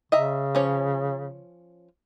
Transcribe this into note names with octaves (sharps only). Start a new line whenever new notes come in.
C#3 D#5 E5 A#5
F3 C#4 C#5